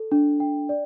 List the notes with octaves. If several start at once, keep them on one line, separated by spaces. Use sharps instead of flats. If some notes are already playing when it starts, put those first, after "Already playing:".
Already playing: A4
D4
G5
D5